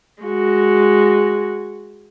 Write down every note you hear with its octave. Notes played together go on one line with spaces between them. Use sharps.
G#3 F#4